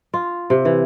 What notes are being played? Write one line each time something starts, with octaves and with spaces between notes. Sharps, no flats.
F4
C3
E3